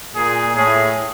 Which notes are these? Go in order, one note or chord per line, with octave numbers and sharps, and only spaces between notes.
A#2 G#4
A2 G#4